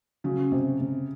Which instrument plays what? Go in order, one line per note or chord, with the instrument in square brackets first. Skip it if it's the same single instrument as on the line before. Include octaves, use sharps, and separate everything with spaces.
[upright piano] C#3 [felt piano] F#3
[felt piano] C3
C3